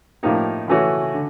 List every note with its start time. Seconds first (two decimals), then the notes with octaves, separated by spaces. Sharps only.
0.23 A2 F3 A#3 D#4 G4
0.68 C#3 E3 A3 C#4 F#4
1.14 D3